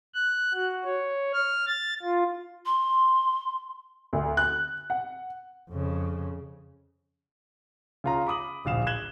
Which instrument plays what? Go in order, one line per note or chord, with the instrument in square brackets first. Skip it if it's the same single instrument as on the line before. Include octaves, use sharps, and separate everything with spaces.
[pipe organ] F#6
F#4
C#5
F6
A6
F4
[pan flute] C6
[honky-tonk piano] D2
F#6
F#5
[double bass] F2 C#3
[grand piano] C#3 F4 A#5
B5 D6 D#6 F#7
D1 A#1 F5 E7
F#6 G#6 E7 F#7 G7